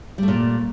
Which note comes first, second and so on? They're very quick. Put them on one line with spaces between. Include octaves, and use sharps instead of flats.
G3 A3 A#2